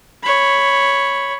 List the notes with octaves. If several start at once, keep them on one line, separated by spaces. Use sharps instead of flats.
C#5 B5